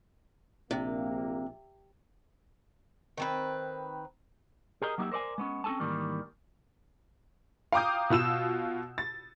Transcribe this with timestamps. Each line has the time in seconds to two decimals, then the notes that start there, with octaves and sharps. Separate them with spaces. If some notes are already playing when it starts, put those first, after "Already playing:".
0.71 A#1 C3 A#3
3.18 D#3 C4 B4
4.82 G4 G#4 A#4 D#5
4.98 F#3 A#3 D#4 F#4 G4 E5
5.12 A#4 C5 D5 D#5 G#5
5.38 G#3 B3 C#4
5.64 C4 C#4 F#4 A4 G#5 A5
5.80 G#2 D#3 E3 G3 A#3
7.72 F5 G5 A#5 D6 D#6 G6
8.10 B2 F4 E6 E7
8.98 A6